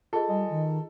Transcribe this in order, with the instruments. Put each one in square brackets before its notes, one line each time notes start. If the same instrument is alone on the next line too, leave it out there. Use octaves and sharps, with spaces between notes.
[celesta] F4 G#4 D#5 [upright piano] A4
[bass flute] G3 [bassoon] G#3
[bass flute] D#3